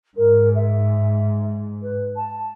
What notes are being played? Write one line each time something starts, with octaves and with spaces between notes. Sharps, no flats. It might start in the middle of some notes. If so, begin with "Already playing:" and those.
G#2 A#4
E5
B4
A5